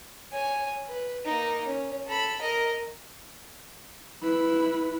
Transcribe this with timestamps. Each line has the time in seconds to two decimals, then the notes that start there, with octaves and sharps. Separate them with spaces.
0.32 C#5 G#5
0.88 B4
1.25 A#3 D#4
1.67 C#4
2.07 A4 B5
2.41 A#4 D#5
4.22 E4 B4